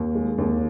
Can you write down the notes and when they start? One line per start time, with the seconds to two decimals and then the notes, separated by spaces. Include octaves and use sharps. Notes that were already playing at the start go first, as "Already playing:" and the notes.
Already playing: D#2
0.15 G#3
0.38 D#2